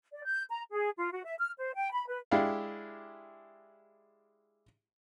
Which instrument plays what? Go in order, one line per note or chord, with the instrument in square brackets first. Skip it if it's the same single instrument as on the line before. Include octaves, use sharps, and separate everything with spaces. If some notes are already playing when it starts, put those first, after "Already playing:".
[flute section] D5
G6
A#5
G#4
F4
F#4
E5
F6
C5
G5
B5
B4
[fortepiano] G#3 D4 E4 G4 F5